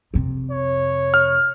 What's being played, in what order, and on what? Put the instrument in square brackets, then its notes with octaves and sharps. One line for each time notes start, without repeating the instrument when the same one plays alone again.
[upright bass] F2 C3
[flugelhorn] C#5
[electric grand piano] F6